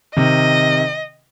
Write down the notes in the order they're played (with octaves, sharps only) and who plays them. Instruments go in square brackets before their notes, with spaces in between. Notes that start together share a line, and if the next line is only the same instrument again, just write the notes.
[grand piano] C3 D#3 [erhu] D#5